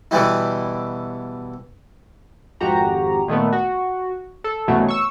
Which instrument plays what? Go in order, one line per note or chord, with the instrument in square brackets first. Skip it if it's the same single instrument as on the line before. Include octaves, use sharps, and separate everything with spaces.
[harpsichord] B2 D3 E3 G3 E4
[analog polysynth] G#1 F2 F#4 G4 A#5
A#2 D#3 A3 B3
F#4
A4
C2 F#2 B2 E3 F#3 A3
C#6 E6